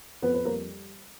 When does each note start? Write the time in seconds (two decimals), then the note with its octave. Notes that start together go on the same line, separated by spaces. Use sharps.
0.22 F2 B3 B4
0.34 B4
0.45 G3 A#3 A#4